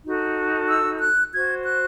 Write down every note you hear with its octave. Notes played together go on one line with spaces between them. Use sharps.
D#4 F#4 A4
E6
F#6
F#4 C5 G#6
F#6